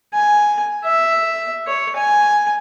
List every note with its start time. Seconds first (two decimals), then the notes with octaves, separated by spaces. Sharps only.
0.14 G#5
0.84 E5
1.67 C#5
1.96 G#5